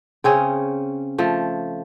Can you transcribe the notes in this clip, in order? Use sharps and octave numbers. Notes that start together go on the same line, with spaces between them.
C#3 C4 C#4 G#4
F3 A3